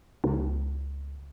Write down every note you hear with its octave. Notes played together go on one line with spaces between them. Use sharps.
C#2